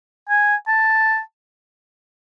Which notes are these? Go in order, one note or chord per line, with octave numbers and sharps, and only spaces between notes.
G#5
A5